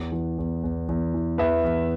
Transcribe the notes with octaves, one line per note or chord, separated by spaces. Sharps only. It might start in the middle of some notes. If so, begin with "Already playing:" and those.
Already playing: E2
E3
E2
E2
E2
E3
E2 B4 E5
E2